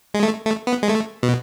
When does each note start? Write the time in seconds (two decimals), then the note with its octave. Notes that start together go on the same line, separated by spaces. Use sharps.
0.14 G#3
0.23 A3
0.45 A3
0.67 B3
0.83 G#3
0.89 A3
1.23 B2